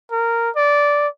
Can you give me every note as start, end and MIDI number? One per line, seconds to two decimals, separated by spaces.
0.12 0.50 70
0.56 1.08 74